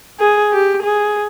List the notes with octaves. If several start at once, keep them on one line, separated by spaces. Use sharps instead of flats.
G#4
G4
G#4